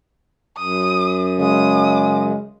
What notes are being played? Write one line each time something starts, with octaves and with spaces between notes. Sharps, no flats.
F#2 D#6
C#3 G#3 D#6